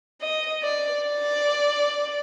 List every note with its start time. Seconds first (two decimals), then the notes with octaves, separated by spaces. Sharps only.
0.22 D#5
0.63 D5
1.04 D5